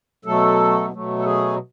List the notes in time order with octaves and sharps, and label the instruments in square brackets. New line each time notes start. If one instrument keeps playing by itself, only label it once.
[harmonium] B2 F#3 A3 A4
B2 F#3 A3
A4
G#4